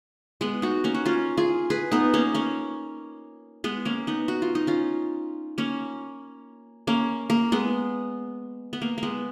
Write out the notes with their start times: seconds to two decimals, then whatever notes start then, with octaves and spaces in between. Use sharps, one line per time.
0.41 G#3 B3
0.62 D#4 F#4
0.84 A#3 C#4
0.94 F#4
1.05 C#4 F4
1.37 F4 G#4
1.70 G#4 B4
1.91 B3 D#4
2.14 A#3 C#4
2.34 A#3 C#4
3.64 G#3 B3
3.85 A#3 C#4
4.07 B3 D#4
4.28 F#4
4.42 F4
4.55 D#4
4.67 C#4 F4
5.58 A#3 C#4
6.87 A#3 C#4
7.30 A#3
7.52 G#3 B3
8.73 B3
8.82 A#3
8.98 G#3 A#3 B3